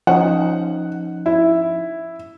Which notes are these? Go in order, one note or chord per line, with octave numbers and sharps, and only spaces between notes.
F3 C#4 D#4 F#5
E4